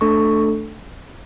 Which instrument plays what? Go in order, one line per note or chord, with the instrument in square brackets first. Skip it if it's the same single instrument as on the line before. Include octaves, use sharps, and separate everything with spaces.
[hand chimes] A3 D4 A4 C#6